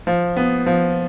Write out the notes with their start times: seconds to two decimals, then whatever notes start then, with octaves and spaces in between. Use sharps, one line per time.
0.07 F3
0.37 B3
0.66 F3